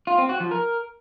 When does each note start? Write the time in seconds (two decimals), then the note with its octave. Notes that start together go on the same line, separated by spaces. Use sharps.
0.07 F4
0.18 C4
0.29 F#4
0.40 F3
0.51 A#4